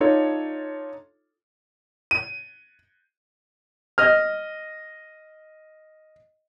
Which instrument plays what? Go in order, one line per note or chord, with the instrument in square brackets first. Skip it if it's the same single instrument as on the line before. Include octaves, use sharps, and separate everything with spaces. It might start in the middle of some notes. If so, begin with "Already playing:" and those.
[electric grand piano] D4 D#4 F4 A4 C#5
[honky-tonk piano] D#7
[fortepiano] D#5 F6